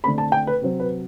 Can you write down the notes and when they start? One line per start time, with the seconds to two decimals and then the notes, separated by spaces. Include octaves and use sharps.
0.04 D3 A3 C4 B5
0.18 A5
0.32 G5
0.47 B4
0.62 C3 F#3 C4
0.80 B4